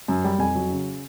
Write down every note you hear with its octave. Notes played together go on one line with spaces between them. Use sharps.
F#2
G3
F2 G#5
F#3
C#3